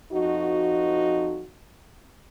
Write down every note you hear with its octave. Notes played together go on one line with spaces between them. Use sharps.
F2 F3 D#4 F#4